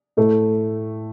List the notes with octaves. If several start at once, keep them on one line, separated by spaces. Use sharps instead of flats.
A2 A3